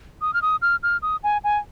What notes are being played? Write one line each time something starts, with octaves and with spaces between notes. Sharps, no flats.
D#6
F6
D#6
F6
F6
D#6
G#5
G#5